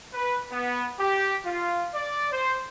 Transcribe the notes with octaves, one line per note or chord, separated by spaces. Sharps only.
B4
B3
G4
F4
D5
C5